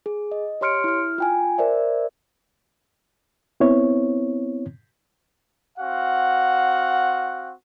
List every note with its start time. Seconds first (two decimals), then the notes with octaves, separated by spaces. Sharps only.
0.06 G#4
0.31 D#5
0.61 G4 C#5 C6 F6 C#7 D7
0.84 E4 F6
1.18 F4 G5 G#5
1.58 A#4 C5 D5 E5
3.60 B3 C4 E4 C#5
5.79 C4 F#4 F5 F#5